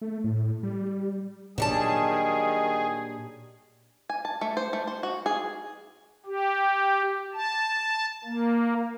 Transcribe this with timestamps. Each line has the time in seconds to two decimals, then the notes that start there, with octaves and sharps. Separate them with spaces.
0.02 A3
0.24 A2
0.63 G3
1.58 A#2 D#3 F#3 G3 D4 G#4 A5
4.09 G#5
4.25 A5
4.41 A3
4.57 C5
4.73 A3
4.87 C5
5.03 F#4
5.26 G#4
6.26 G4
7.34 A5
8.25 A#3